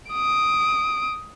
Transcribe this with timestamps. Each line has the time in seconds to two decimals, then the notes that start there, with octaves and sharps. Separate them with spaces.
0.11 D#6 D7